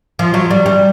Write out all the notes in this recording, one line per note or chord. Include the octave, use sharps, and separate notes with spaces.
F3
F#3
G3
G3